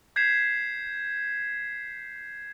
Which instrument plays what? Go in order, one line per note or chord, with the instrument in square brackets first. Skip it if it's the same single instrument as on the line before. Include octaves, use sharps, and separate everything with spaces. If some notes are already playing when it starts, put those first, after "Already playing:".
[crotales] G6 G#6 B6 C7 E7